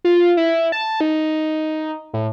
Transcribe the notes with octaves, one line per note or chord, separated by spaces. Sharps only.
F4
E4
A5
D#4
A2